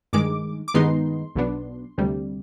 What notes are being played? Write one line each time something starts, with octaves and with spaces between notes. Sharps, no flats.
G2 D#3 G#3 D6
D6
G2 D#3 G#3 B3 D#4 C6
B1 B2 B3 D4
D2 C3 G3